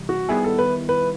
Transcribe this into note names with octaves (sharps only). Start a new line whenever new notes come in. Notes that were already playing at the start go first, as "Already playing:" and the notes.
Already playing: C3 E3 G3
F#4
D#3 G3 B3 E4 G#4
A4
B4
B4